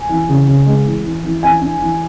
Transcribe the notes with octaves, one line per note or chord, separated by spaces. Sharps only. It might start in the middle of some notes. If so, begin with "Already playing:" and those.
Already playing: G#5
E3
C#3
C#3
G#3
E3
E3
E3
E3 G#5
D4
E3